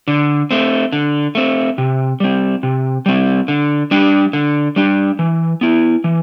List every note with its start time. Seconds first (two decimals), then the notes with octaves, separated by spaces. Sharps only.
0.08 D3
0.51 A3 C4
0.92 D3
1.35 A3 C4
1.78 C3
2.20 G3 C4
2.63 C3
3.06 G3 C4
3.48 D3
3.91 G3 D4
4.33 D3
4.76 G3 D4
5.19 E3
5.61 B3 E4
6.04 E3